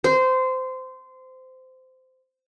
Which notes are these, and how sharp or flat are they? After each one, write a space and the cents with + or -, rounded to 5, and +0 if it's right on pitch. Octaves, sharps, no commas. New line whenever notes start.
C5 -20